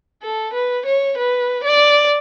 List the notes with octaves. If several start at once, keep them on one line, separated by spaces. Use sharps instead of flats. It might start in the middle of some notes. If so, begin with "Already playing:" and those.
A4
B4
C#5
B4
D5